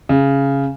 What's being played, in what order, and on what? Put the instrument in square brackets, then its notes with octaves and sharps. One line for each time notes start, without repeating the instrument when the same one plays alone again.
[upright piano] C#3